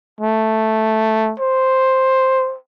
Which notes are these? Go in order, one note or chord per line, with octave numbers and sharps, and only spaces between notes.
A3
C5